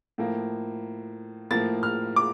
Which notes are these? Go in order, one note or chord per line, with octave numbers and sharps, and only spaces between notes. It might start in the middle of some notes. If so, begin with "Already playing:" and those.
A2 F3 A#3
A2 F3 A#3 A6
F6
D6